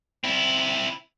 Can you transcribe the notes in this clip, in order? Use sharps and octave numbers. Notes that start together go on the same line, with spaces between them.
C4 E4